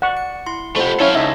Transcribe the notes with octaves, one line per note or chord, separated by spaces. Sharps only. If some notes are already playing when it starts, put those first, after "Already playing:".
D5 F#5 C#6
C#7
E4 C6
F2 A3 G4 F#5 B5
C#4 E4 A4 C#5 F5
C#2 D#4 D#5 E5 A5